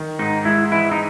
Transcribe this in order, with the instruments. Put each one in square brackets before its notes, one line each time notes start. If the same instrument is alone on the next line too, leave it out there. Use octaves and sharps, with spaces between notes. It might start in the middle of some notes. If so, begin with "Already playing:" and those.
Already playing: [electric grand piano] D#3
[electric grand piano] G#2 [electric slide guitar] D#4
[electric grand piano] G#3 [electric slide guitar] E4
[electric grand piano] E3 [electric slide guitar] E4
[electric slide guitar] D#4